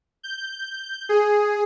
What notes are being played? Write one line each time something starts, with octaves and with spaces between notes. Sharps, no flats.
G6
G#4